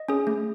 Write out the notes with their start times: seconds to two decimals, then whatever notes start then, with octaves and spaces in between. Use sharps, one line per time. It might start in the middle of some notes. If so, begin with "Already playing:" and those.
Already playing: D#5
0.08 C#4 G#4
0.27 A3